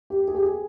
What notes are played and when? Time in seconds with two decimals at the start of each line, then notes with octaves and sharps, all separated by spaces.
0.10 G4
0.28 G#4
0.35 G4
0.43 G#4